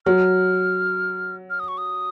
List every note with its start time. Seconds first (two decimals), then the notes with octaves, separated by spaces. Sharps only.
0.06 F#3 F6
1.50 F6
1.60 D#6
1.68 C#6
1.78 D#6